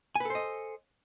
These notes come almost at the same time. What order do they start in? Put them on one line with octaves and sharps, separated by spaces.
G#5 B4 A4 C5 D#5